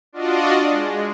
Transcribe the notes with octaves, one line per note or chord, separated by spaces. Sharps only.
D4 F4 F#4 D5 D#5
G#3